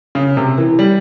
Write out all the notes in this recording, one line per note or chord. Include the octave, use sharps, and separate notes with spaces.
C#3
C3
E3
G3